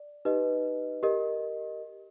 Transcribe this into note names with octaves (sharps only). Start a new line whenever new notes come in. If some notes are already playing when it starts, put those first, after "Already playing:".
Already playing: D5
D#4 G4 B4 D#5
G4 A#4 D#5